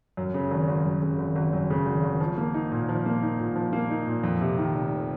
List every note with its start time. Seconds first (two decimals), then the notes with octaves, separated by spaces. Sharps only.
0.17 F#2
0.34 C#3
0.51 G#1
0.68 G#1
0.85 F#2
1.02 C#3
1.18 G#1
1.36 G#1
1.53 F#2
1.70 C#3
1.86 G#1
2.03 G#1
2.21 F3
2.37 A#3
2.54 D#4
2.72 A#2
2.89 F3
3.06 A#3
3.22 D#4
3.40 A#2
3.56 F3
3.73 A#3
3.90 D#4
4.07 A#2
4.23 F2
4.41 C3
4.58 D#3
4.75 F1